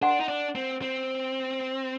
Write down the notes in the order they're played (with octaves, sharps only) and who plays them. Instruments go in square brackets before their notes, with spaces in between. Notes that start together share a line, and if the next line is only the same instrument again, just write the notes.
[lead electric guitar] D4 [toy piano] A#4 F#5 C6
[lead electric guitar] D#4
D4
C4
C4